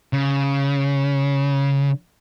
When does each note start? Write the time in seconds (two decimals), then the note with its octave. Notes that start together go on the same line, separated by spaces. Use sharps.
0.13 C#3